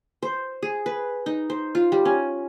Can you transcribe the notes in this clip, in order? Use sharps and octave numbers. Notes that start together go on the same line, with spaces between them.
C5
G#4
B4
D#4
C5
F4
G3
C#4